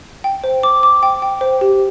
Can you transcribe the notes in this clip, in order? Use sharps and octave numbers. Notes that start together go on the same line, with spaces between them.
G5
C5
D6
D6
G5
G5
C5
G4